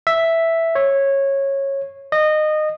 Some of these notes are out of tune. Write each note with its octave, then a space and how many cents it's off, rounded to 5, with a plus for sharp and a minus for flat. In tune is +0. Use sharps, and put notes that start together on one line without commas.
E5 +0
C#5 -15
D#5 -20